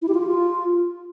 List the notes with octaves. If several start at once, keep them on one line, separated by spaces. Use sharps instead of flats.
E4
G4
F4
G4
F4